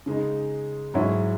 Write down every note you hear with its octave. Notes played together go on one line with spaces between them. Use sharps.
C#3 G#3 D#4
G#2 F#3 C#4 E4